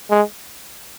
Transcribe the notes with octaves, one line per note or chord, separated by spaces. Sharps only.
G#3